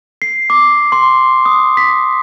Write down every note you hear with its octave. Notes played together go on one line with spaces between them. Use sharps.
C7
D6
C6
D#6
B6